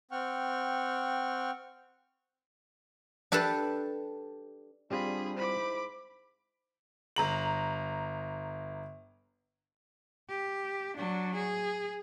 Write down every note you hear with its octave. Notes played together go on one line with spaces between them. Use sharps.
C4 F#5 G5 C#6 F6
D4 G4 A4 B4 A5
G3 C4 D4 F4 G#4 B5
G#2 E4 C5 B5 D6
G1 A#5 F#7
G4
F#3 D4
G#4